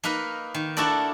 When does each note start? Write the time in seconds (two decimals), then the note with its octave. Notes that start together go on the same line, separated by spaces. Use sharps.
0.04 A#3 D#4 A#4 B4
0.54 D#3
0.77 D4 E4 F#4 A4 A#4 D5